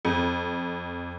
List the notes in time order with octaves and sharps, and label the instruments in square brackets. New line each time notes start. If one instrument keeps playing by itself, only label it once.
[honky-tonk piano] F2